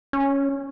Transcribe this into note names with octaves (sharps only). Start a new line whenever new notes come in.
C#4